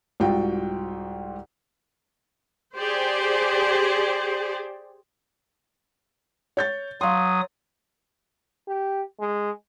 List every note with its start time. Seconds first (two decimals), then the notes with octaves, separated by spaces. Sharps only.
0.20 C2 G#2 F4 F#4 G5
2.77 G4 G#4 C5 D5
6.57 C#5 G6 A6
7.01 F#3 F5 C6 D#6
8.68 G4
9.20 G#3